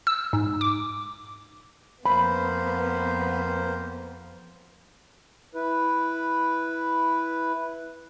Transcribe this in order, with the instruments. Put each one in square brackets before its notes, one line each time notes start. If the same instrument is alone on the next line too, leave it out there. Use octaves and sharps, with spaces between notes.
[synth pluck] E6
G#2
D6
[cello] F2 [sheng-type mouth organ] A#3 C5 [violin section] B3 [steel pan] B5
[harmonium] E4 B4